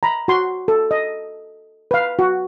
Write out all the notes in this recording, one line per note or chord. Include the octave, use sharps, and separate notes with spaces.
A#5 B5
F#4 C6
A4
D#5
B4 F5
F#4